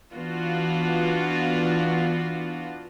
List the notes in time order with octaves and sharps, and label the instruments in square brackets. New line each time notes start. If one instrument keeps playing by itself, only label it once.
[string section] E3 B3 D4 F4 F#4